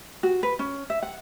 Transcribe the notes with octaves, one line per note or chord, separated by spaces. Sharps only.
F#4
B4
C#4
E5
F#5